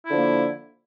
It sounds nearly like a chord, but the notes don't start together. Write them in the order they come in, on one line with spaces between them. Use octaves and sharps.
E4 D3 F3 A#3